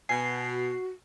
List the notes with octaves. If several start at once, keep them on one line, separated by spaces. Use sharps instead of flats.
B2 G#5 C7
F#4